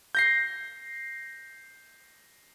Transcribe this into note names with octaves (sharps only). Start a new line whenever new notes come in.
G6 A#6 C7